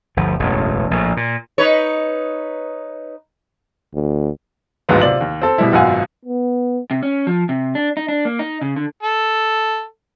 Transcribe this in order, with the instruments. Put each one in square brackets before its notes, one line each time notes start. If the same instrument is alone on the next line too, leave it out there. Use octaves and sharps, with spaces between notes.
[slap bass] G1 D2 F3
E1 A1 F#2
A#1 A2
A#2
[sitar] D#4 B4 C#5
[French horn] D2
[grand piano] D1 G#1 D#2 F#3 G#3 B3
C3 F4 D5 F#7
D#2
C4 A4
B2 G3 E4
G#1 F#2 B2 F4 F#5 G#5
[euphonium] B3
[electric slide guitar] C3
C#4
F3
C3
D4
D#4
D4
A#3
D#4
C#3
D3
[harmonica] A4